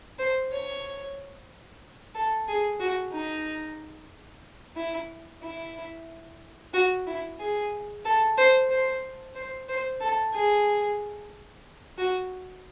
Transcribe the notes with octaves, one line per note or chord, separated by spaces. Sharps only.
C5
C#5
A4
G#4
F#4
D#4
E4
E4
F#4
E4
G#4
A4
C5
C5
C5
C5
A4
G#4
F#4